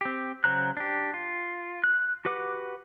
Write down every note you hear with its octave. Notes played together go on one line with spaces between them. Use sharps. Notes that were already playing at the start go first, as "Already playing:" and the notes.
C4 G4
C#3 F#3 C5 A#5 F#6
D4 G4
F4
F#6
F#4 G4 B4 F#5 D6